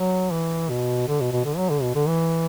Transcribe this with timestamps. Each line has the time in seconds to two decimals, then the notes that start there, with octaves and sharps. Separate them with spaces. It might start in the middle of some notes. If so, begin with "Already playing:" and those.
Already playing: F#3
0.31 E3
0.70 B2
1.08 D3
1.20 B2
1.32 B2
1.44 D3
1.57 F#3
1.70 D3
1.82 B2
1.95 D3
2.08 E3